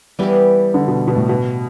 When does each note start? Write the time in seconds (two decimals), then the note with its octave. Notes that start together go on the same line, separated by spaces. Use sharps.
0.19 E3 G3 B3 E4 G4
0.74 D3
0.88 B2
1.07 B2
1.15 A2
1.29 B2